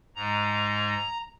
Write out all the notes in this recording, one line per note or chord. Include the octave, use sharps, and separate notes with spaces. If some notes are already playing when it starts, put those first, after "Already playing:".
G#2 G#3 A#5